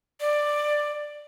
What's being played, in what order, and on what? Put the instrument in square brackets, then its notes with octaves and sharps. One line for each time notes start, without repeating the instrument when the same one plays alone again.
[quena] D5